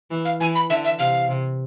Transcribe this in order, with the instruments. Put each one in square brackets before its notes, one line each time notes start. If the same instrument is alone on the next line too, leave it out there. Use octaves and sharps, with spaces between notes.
[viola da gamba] E3
[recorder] F5
[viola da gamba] E3 [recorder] G#5
[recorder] B5
[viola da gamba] D3 [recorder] E5
[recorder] E5
[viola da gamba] C3 [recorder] F5
[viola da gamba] C3